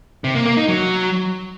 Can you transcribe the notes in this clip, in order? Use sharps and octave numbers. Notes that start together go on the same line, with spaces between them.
C3
A#3
A#3
D#4
F#3